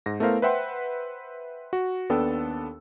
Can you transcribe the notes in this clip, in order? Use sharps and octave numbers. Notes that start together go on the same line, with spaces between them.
G#2 A#6
A3 B3 E4 A#4 C5 F5
B4 C5 E5 F#5 G5 C6
F#4
D#2 B3 D4 A4 G5 E6